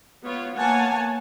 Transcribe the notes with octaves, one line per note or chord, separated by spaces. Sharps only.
B3 F4 C#5
A#3 B3 C#5 F#5 G#5 A5